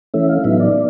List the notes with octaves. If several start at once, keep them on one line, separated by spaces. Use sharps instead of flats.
E3 A3 C#4 E5
F5
A2 F#3 B3 D#4 E5
D5
B3